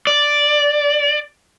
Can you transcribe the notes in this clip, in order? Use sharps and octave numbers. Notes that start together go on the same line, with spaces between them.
D5